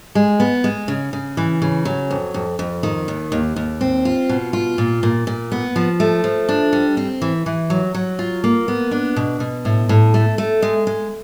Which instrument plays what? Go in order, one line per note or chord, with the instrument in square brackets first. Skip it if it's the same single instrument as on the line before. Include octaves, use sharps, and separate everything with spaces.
[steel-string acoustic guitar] G#3
B3
G#3
C#3
C#3
E3
C#3
F#3
F2
F2
F2
D#3
D#2
D#2
D#2
C4
F4
B2
F4
A#2
A#2
A#2
B3
F3
A3
F3
D4
G3
C4
E3
E3
F#3
F#3
F4
A#3
B3
D4
B2
B2
A2
A2
A3
A3
G#3
G#3